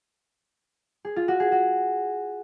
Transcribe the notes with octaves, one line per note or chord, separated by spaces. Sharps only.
G#4
F4
F#4
G#4
F#4